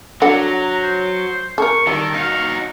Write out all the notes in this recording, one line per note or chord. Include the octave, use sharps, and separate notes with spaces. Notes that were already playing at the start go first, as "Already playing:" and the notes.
F#3 D4 A4 F#5 A#5
C5
A4 A#4 C#6
D#3 G3 A4
D#4 F#4 F5